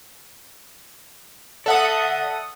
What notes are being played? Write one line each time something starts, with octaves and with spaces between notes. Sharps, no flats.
A4 D5 E5 F#5 D#6